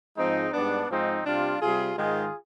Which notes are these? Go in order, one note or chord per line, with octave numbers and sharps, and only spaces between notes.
G#2 F3 G#3 C4 D#4
G#2 G3 B3 D4
G#2 F3 G#3 C4 D#4
C3 G3 D4 F4
C3 G3 F4 G#4
G#2 D#3 G#3 F4 G#4